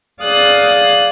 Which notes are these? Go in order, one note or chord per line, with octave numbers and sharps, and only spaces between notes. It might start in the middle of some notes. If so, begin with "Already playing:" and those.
G#4 D5 F5 D#6 F#6 A6